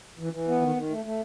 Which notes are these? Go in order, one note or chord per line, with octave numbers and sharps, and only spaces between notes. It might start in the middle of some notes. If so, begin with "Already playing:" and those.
E3
E3
B3
D#3
D#3
A3
A3